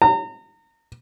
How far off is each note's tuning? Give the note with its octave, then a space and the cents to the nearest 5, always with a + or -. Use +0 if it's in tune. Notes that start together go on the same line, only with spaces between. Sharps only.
A#5 -35